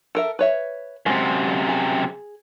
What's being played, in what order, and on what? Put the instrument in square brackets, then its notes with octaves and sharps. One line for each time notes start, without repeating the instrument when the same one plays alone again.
[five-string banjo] A4 A#4 E5
B4 C#5 E5
[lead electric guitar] F#2 C3 [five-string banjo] G#3 C4
[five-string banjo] G#4